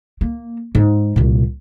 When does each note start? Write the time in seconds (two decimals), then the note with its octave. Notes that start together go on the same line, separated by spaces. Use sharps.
0.21 A#3
0.75 G#2
1.16 C2 A#2